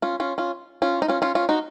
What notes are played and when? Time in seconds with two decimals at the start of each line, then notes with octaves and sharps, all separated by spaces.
0.02 C#4 F4
0.20 C#4 F4
0.38 C#4 F4
0.82 C#4 F4
1.02 D#4
1.08 C#4 F4
1.22 C#4 F4
1.35 C#4 F4
1.49 D#4 F#4